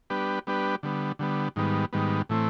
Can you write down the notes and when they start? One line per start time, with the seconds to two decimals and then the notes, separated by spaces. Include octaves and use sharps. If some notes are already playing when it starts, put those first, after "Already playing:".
0.10 G3 B3 D4 G4 B4
0.47 G3 B3 D4 G4 B4
0.83 D3 G3 B3
1.19 D3 G3 B3
1.56 G#2 D#3 G3 B3
1.93 G#2 D#3 G3 B3
2.29 A2 E3 A3 C4